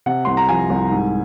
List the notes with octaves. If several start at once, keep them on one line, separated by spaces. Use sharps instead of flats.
C3 F#5
C2 C6
A#5
F3 G#5
C2
G#2